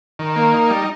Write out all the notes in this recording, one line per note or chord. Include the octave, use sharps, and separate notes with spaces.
D#3
A#3
D#4
G3